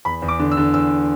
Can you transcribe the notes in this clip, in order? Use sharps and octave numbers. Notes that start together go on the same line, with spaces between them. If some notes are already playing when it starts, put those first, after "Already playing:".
E2 B5
E2
D6
D3
E6
D3
E2 E6